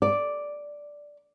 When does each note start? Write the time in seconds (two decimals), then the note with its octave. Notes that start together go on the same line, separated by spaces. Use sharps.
0.02 D5